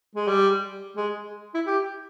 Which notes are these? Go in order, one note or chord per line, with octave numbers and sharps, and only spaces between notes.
G#3
G3
G#3
E4
G4